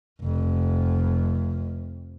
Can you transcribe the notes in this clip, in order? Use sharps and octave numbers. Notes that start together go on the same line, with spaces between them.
F1 F2